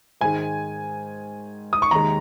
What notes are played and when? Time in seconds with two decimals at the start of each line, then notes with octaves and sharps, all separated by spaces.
0.21 G#2 D#3 G#3 G#5
1.73 D#6
1.82 C#6
1.91 D#2 D#3 G#3 A#5